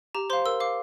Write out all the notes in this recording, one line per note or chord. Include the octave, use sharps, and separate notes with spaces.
G4 A#5
C5 F5 C6
A#4 E6
F5 D6